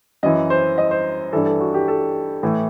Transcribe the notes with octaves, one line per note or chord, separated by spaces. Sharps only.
F#2 E3 D#5
C5
D#5
C5
G2 E3 A4
A4
F#4
G4
A4
A2 E3